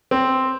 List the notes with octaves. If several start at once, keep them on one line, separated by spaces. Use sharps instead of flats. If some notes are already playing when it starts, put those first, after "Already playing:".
C4